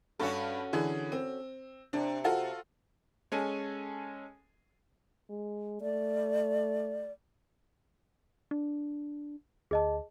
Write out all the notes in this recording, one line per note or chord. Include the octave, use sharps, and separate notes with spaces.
G2 C#4 F#4 A4
D3 E3 G#4
C4
C3 D4
F4 F#4 A4
G#3 C#4 A4 G#5
G#3
A3 D5
D4
D2 G#4 D#5 A5